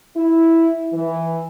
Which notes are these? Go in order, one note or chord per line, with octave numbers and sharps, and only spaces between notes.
E4
E3